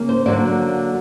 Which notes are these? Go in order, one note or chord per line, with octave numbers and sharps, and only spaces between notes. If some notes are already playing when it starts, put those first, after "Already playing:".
Already playing: C#3 A#3
C5
D3 F#3 A#3 D5